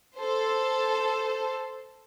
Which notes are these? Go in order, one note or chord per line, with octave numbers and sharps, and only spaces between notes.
A4 C5